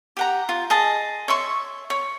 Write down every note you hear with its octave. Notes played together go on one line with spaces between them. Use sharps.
G4 F#5 A#5
F4
G#4 D#5 A5
C#5 E5 C6 C#6
C#5